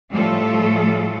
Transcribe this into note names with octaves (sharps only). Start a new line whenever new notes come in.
A2 F3 G3 A3 F4 A4